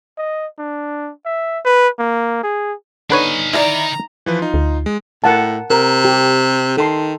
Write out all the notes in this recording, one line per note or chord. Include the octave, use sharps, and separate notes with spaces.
D#5
D4
E5
B4
A#3
G#4
D3 D4 D#4 B4 C#5 G#5
D#3 E4 A#4 D5 A#5
E3 F3 B4
D#4 F4
D2
G#3
A2 A#4 F#5 A5
C3 A#4
G4
D#3 A4 C6